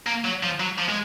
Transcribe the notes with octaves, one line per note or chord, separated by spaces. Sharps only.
A#3
F#3
F3
F#3
F3
G#3